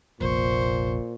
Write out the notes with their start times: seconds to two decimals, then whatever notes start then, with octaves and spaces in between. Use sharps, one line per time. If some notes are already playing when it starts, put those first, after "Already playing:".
0.20 F1 A#1 A#2 C5 C#6